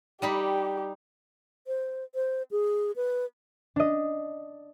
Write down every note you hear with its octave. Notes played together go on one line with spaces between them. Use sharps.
G3 D#4 G4 B5
C5
C5
G#4
B4
D4 D#5